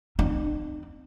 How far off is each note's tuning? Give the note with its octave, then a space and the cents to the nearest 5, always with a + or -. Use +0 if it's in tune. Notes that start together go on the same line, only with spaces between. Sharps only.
C4 -25 D#4 -45